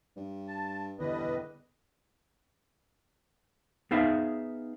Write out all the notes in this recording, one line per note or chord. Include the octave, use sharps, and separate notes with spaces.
G2
A5
E2 D3 G3 B4 D#5
B3 D#4 G#4 E5 F5